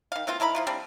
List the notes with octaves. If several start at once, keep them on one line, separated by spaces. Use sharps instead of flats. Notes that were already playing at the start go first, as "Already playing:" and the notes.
D#3 F5
E3 A#3 C4 F4
D#3 E4 A#5 B5
F3 E4 F4
G3 C4 D4